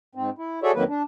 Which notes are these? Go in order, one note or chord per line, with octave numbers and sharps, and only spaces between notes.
G#2 C4
E4
F#4 G#4 A4 C#5 D5 E5
F2 D#3 F#3 A#3 B4
D4